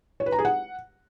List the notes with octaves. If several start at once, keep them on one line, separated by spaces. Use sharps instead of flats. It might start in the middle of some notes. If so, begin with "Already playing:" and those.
C#5
B4
A#5
G#4
F#5